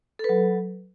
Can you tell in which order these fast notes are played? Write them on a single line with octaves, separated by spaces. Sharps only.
A4 B4 F#3